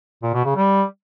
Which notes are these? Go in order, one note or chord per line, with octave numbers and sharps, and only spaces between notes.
A#2
B2
C#3
G3